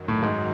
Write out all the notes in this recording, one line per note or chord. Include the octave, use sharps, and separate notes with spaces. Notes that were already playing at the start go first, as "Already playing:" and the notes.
Already playing: F#2 D#3 F#3
A2
G#2